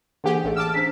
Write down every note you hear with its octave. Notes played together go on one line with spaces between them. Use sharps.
D3 E3 A#3 G4 G#4 F#5
A1 A3
A5 D6 E6 F6
C#4 D4 C5 B6